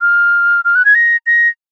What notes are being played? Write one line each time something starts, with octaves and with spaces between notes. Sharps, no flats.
F6
F6
F#6
G#6
A#6
A#6